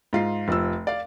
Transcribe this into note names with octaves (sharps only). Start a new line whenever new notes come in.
G#2 F4 C7
F1 F3 E6
D5 F5